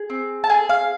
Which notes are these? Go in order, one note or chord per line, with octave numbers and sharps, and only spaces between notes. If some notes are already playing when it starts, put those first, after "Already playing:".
Already playing: G#4
C4
A5
G#4 G#5
F5